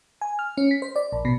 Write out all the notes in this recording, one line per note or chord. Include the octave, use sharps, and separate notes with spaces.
G#5
F6
C#4
B6
C5
D5
A#1
B2